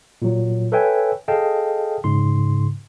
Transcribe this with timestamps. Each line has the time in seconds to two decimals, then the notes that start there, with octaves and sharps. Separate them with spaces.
0.22 A#2 F#3
0.72 A4 B4 C#5 E5 G5 G#5
1.28 G#4 A4 D#5 F5 G5 A5
2.04 G#2 C#3 C6